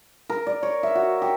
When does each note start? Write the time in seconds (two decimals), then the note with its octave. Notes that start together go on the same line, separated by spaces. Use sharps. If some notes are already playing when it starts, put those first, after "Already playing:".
0.30 A#4
0.47 D5
0.63 C#5
0.83 E5
0.95 F#4
1.22 G4